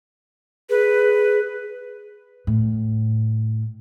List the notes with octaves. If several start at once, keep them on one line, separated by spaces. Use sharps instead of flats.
G#4 B4
A2